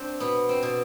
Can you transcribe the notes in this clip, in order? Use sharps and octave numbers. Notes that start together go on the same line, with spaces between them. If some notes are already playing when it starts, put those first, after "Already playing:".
Already playing: C4 D4
B2 B3
C4
B2